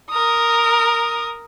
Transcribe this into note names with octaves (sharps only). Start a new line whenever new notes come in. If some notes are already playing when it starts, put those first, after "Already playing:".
A#4 D#6